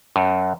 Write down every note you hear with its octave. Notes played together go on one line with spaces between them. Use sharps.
F#2